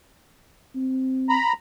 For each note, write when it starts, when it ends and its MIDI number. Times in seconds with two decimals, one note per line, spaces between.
0.75 1.38 60
1.29 1.53 82
1.29 1.53 83